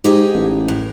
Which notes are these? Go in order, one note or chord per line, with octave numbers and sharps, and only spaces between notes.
G#2 G4 G#4 D#5
A1
A2